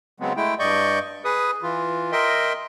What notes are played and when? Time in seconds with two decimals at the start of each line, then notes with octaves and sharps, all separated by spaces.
0.20 C#3 F#3 G#3 B3 C4
0.36 G#3 A3 E4 G5
0.59 G2 D5 D#5 C#6 G6
1.25 G#4 B4 D#6
1.63 E3 F4
2.12 A#4 D#5 E5 G5 C6